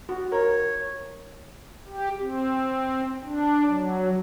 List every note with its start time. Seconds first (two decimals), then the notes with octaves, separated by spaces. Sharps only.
0.09 F#4
0.32 A#4 C#5
1.87 G4
2.20 C4
3.22 D4
3.67 F#3